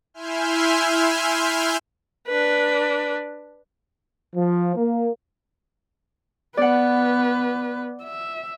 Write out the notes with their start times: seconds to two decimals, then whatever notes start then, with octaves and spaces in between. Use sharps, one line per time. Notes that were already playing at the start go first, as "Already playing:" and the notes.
0.14 E4 E5 G#5 C6 F6 G6
2.28 D4 B4
4.35 F3
4.76 A#3
6.57 B3 B4 D5 F#5
8.03 E5